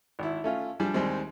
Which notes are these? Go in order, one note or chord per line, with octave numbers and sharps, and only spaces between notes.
G#1 E4
A3 C#4 F4
F3 G3 D4 G#4
D#2 G3 G#3 C4